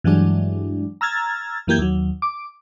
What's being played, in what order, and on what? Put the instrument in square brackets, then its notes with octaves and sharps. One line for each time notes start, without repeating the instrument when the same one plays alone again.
[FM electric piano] G2 E3 F#3 G#3 D4
A#5 E6 F6 G#6 A6
F#2 E3 A#3 G4 G6 G#6
D#2 F#3
D6